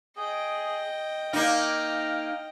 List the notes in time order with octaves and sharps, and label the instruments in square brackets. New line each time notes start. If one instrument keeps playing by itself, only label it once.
[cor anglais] G#4 [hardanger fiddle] D#5 G5
[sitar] A#3 D#4 [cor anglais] F5